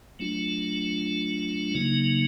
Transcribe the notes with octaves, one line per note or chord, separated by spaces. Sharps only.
F#3 A3 D4 F4
C#3 F#3 A#3 D#4